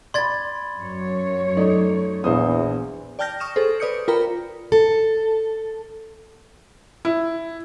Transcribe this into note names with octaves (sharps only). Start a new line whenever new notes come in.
D5 B5 C6 G#6 A6
F#2 C#5
A3 D#4 D5
A#1 E2 C5 D#6
D5 G5 A5 F6 G6 A#6
C#6 D#6 F6 E7
G#4 A4 C5
B4 D5 D#6 G6 C#7
F4 A#4 G5 A#5 B5
A4
E4